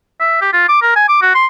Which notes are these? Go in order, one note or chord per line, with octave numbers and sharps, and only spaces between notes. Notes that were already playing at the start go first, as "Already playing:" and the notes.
E5
G4
F4
D6
A#4
G#5
D6
F#4
C6